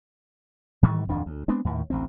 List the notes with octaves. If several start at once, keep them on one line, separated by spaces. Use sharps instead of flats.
G#2 D#3 E3 G3
D1 F2 D#3 D4
D2
G#3 B3 C4 D4
D#2 A2 D3 D#3
A1 D2 C4